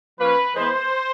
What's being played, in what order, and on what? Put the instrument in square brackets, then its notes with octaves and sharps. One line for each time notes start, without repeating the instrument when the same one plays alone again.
[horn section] F3 A#3 C#4 B4
E3 G#3 B3 C5